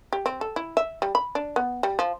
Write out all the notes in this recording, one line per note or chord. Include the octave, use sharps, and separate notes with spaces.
G4
C4
A4
E4
E5
G3
B5
D4
B3
G3
F3